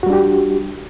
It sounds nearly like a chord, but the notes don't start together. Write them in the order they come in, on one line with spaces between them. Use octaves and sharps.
F#4 G3 D4 G4